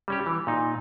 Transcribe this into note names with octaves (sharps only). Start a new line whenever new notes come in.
G3 C#4 G4
E3
A#2 D#4